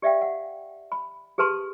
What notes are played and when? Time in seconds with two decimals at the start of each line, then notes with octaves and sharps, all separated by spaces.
0.02 G4 D5 E5 F5 G5
0.22 F#5
0.92 B5
1.38 G4 G#4 B4 A5 C6